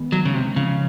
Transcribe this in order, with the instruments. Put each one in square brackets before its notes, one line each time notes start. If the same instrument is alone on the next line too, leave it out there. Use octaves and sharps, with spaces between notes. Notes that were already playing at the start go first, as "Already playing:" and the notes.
Already playing: [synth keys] D#3 G#3 B3
[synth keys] D#3 [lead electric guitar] F#3
[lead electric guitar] C#3
C3
[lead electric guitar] C#3 [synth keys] F3